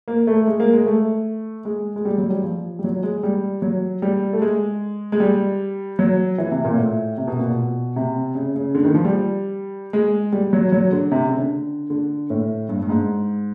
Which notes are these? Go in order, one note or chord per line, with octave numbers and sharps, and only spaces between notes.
A#3
A3
G#3
A#3
G#3
A3
G#3
G#3
G3
F#3
G3
F3
G3
F#3
G#3
G3
F#3
G3
A3
G#3
G#3
G3
F#3
E3
C3
A#2
A2
C3
B2
A#2
B2
C3
C#3
C#3
D3
D#3
F3
G3
G#3
G3
F#3
F#3
D3
C3
C#3
D3
D3
A2
G2
G2
G#2